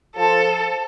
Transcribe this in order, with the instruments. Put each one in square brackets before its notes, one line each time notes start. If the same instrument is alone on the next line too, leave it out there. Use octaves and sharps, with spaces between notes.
[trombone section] F3 [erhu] A4